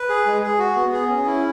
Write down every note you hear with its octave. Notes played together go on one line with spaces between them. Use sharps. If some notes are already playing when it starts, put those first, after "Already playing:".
Already playing: B4
G#4
G#3
G#4
F#4
B3
G#4
C#4
E4